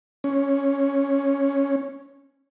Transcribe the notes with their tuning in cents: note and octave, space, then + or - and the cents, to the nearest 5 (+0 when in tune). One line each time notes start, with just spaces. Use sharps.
C#4 +0